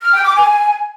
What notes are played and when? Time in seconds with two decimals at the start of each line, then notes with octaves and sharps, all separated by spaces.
0.01 F6
0.12 G5
0.24 D6
0.36 G#5